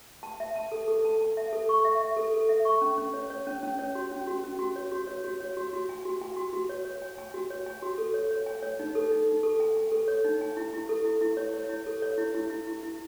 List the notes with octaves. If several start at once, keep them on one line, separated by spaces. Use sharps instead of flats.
A5
E5
A5
A4
A4
A5
A5
E5
A4
C#6
E5
E5
A4
A4
E5
C#6
C#4
C#4
C#5
C#5
C#4
C#4
C#5
F#4
C#4
F#4
C#4
F#4
C#5
F#4
C#5
F#4
C#5
F#4
F#4
G#5
F#4
G#5
F#4
F#4
C#5
C#5
G#5
G#5
F#4
C#5
G#5
F#4
A4
C#5
C#5
G#5
C#5
D#4
A4
D#4
D#4
A4
G#5
G#5
A4
C#5
D#4
G#5
E4
E4
A4
E4
E4
C#5
C#5
E4
A4
C#5
E4
E4
E4
E4
E4